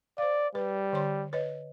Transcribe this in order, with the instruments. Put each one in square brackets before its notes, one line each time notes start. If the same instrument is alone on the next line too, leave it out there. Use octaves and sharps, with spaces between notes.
[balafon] C5 F5 [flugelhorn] D5
[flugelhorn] G3 [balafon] B4
[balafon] D3 C#5 C6
B4 C#5 D#5